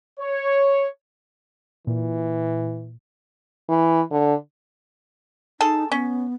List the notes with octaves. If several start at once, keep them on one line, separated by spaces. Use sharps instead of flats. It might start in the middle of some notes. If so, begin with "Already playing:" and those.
C#5
A#2 E3
E3
D3
D#4 G#4 A4 A5
B3 C#4